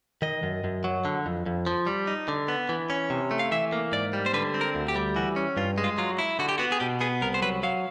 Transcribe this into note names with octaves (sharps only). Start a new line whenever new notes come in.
D#3 D#5
F#2
F#2
F#3
D3
F2
F2
F3
G3
D#4
D3
B3
E3
C#4
C3
A3
F5
E3 E5
A#3
G#2 D5
G3
C5
D3 B4
C4
A#4
D2
G4
G3
E3 F#4
C#4
G2 F4
G#3
F4
F#3 F4
E4
D3 F#4
G4
B3 F#4
G#4
B2 G4
B3 G#4
C2 A#4
C5
F#3 B4
F#3 F5